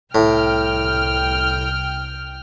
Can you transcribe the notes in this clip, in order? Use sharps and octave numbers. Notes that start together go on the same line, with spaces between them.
C2 A2 G5 F6